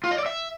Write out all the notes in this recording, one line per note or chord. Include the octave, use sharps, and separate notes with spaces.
F4
D#5
D5
E5